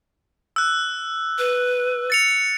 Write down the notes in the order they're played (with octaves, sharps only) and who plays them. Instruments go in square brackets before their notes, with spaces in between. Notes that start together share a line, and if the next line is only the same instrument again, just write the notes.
[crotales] E6 F#6
[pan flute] B4
[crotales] A6 C#7 F7